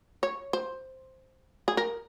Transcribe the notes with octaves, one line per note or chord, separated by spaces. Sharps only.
C#5
C5
G#4
A#4